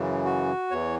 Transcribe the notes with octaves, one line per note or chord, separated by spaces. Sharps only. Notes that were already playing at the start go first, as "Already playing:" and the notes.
Already playing: F#2 C#3 E3
F#4
E2 E3 C#5